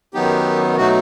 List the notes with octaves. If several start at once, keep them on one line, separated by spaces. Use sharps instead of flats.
F#2 D#3 F#3 B3 D#4 G4
B2 F#3 A3 D#4 F#4